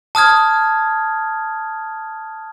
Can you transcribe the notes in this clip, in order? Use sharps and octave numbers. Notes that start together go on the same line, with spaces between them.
A5 D#6 F6 G#6